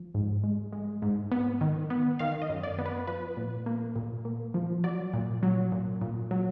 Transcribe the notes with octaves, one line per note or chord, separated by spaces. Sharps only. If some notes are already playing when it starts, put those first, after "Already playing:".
Already playing: F3
G#2
G#3
G#3
G#2
B3
D#3
B3
D#3 F5
D#5
F#2
D5
B3
B4
F3 B4
A#2
A#3
A#2
A#3
F3
F#3 D5
A#2
F#3
A#2
A#2
F#3